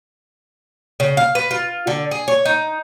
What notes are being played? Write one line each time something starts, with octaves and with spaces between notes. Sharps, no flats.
C#3
F5
B4
F4
D3
G#4
C#5
D#4